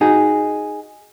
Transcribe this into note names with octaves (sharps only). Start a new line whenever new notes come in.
D#4 F#4 G#4